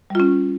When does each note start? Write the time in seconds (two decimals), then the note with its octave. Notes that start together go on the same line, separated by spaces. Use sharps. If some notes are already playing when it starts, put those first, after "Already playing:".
0.10 G3
0.15 F4
0.20 C#4